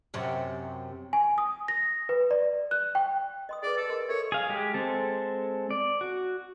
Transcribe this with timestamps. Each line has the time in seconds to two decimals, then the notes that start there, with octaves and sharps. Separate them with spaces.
0.14 F#2 C3
1.13 G#5
1.38 D#6
1.68 A#6
2.09 B4
2.31 D5
2.71 F#6
2.95 G5
3.49 D#5 C6 D#6
3.63 G#4 B4 D5
3.77 A4
3.89 A#4 D#5 C6
4.09 A4 A#4 C#5 E5
4.32 G#4 F5
4.49 G#3 G4
4.74 G#3 C4 A4
5.71 D5
6.01 F#4